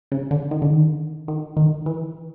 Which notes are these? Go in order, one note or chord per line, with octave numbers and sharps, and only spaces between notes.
C#3
D3
D#3
D3
D#3
D#3
D#3
E3